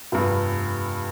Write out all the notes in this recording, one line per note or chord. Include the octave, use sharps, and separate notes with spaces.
F1 G2